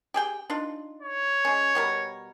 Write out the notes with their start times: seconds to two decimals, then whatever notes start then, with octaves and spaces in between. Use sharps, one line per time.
0.14 G4 G#4 G5
0.50 D4 D#4 F4
1.02 C#5
1.45 G#3 C#4
1.75 B2 G3 A#4